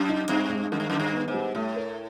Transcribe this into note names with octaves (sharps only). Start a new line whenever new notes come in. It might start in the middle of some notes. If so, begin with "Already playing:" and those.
Already playing: F#2
D#4
G2 C4
G#3
F#2 D#3
G2
F#2 D#3
G2
B3
G#2
G3
A2 A3
A#4